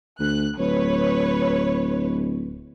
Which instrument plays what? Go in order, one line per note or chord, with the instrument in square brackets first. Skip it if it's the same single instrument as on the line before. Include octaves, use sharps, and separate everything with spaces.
[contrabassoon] D2 [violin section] F#6
[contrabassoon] D1 [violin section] B4 C#5